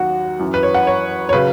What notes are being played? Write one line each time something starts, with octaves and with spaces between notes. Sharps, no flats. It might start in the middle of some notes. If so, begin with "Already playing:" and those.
Already playing: D#2 D#3 F#3 F#4
F#2 E3
B4
C#5
F#5
C#5
C#5
C#3 F#3 B4